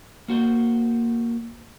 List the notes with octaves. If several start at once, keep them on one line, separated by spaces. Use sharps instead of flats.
A#3 F#4 C5